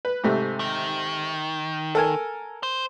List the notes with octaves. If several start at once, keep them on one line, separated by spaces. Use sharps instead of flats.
B4
G#2 C3 A3
D#3
A4 A#4 G#5
C5